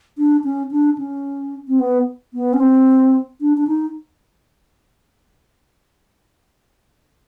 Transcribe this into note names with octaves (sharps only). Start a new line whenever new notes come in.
D4
C#4
D4
C#4
C4
B3
B3
C#4
C4
D4
D4
D#4